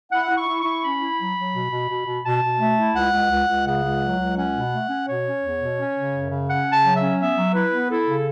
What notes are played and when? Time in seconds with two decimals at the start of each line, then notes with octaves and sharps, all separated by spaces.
0.12 E4 F#5
0.30 E4
0.36 C#6
0.48 E4
0.60 C#6
0.65 E4
0.82 C#4 B5
1.01 E4
1.18 F#3
1.36 F#3
1.54 B2
1.71 B2
1.89 B2
2.06 B2
2.24 B2 A5
2.42 B2
2.60 A3
2.78 E4
2.94 C#2 F#5
3.12 C#2
3.31 C#2
3.48 C#2
3.66 C#3 F#5
3.83 C#2
4.01 F#3
4.18 C#2
4.36 C#4 F#5
4.54 B2
4.71 A3
4.90 C#4
5.06 B2 C#5
5.24 C#4
5.42 E2
5.60 B2
5.78 C#4
5.95 C#3
6.13 F#2
6.30 C#3
6.48 C#4 F#5
6.66 C#3
6.71 A5
6.83 F#3
6.95 E5
7.01 C#4
7.18 B3 E5
7.36 F#3
7.53 E4 B4
7.72 B3
7.89 E4 A4
8.07 C#3